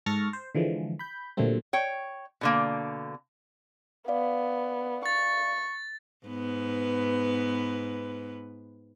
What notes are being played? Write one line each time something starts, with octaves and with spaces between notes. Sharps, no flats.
G#2 A4 C#6 F6 A6 A#6
C5
D3 E3 F3 G#3
B5 G6
A#2 D3 F#3 G3 A3 C4
C#5 G5
B2 D3 A#3
B3 D5 F5
C#6 A6
G#2 B3 B4